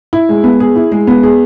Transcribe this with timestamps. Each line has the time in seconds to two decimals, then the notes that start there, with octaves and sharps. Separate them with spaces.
0.13 E4
0.29 G#3
0.44 B3
0.60 G#4
0.76 E4
0.92 G#3
1.07 B3
1.23 G#4